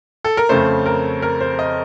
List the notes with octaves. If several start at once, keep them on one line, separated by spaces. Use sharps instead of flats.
A4
A#4
F2 C#3 A3 C5
A#4
A#4
C5
D#5